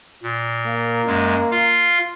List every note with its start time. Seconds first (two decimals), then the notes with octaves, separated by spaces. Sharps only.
0.23 A#2
0.67 A#3
1.07 F#2 G#3
1.51 F4 F5 F6